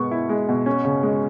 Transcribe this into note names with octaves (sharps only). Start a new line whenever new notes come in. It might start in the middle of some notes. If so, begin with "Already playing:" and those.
Already playing: B2 G#3 B3 C#6
E4
G#3
B2
C#4
C#3
G#3